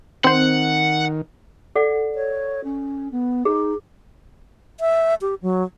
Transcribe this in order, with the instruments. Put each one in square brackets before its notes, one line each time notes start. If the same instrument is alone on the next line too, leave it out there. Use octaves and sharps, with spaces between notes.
[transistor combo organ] D#3 [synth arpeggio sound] C4 C5 [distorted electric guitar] F#5
[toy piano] A4 D5 F#5
[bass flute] C#5
C#4
B3
[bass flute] D#4 [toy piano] G#4
[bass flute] E5
G4
F#3